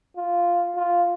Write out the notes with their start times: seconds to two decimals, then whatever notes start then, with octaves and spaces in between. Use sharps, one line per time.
0.17 F4
0.76 F4